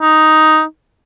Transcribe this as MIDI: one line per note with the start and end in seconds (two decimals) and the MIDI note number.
0.02 0.63 63